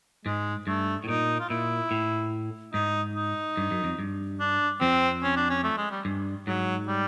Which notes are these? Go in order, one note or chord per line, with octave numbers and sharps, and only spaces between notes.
G#2 G#3
G2 A3
A2
A#2 D#4
F4
A#2 E4
A2
G#2 D#4
D#4
G2
F#2
F2
G2
D4
F2 C4
C#4
D4
C#4
A3
G#3
G3
G2
G#2 F#3
G3